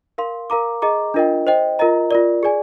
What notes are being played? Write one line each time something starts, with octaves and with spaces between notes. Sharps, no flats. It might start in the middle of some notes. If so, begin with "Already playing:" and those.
A#4 F5 C6
A#4 F5 A#5 D6
G#4 D#5 A#5 D6
D4 F4 A#4 D#5 G5
C5 D#5 G5
F4 A#4 D#5 A#5
F4 A#4 D5
G#4 D5 G#5